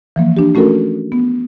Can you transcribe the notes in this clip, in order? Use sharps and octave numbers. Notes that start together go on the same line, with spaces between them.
E3 F3 A#3
D4 G4
A3 C#4 F#4 A4 A#4
B3